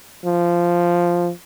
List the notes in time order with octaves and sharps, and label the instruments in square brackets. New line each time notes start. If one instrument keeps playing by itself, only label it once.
[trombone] F3